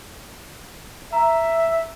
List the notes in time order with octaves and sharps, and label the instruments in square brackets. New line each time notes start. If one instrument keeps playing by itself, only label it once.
[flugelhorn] E5 [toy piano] A#5